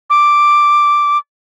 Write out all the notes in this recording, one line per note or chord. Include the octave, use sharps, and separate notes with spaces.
D6